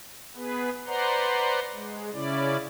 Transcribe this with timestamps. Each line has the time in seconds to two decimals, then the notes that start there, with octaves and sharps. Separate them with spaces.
0.35 B3 G#4 B4
0.87 B4 C5 D5 F#5 A#5 C6
1.74 G#3
2.13 C#3 C#4 E4 D5